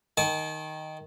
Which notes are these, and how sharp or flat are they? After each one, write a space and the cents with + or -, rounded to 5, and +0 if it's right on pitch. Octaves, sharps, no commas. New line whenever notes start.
D#3 +0 A5 -45